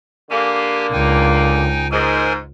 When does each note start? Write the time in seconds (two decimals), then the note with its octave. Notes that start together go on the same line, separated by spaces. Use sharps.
0.30 D3 A#3 G4 G#5
0.92 C#2 D#4 G5 G#5
1.91 G#2 A#4 C5 G#5